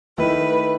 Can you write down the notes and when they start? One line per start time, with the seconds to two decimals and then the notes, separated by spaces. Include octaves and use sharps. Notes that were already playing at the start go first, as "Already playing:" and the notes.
0.17 D#3 A3 E4 B4